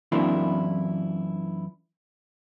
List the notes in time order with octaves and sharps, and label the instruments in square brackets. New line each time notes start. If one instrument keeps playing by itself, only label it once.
[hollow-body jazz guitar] F#2 E3 A#3 C4 D4 E4